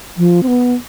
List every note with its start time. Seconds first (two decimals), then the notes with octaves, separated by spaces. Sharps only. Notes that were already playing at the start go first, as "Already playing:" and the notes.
0.18 F3
0.43 C4
0.48 B3